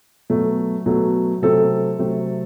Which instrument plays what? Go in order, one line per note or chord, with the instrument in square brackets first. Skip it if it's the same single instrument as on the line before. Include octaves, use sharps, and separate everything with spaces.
[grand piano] B2 F#3 A3
B2 F#3 A3
C3 F#3 A3 C4 A4
C3 F#3 A3 C4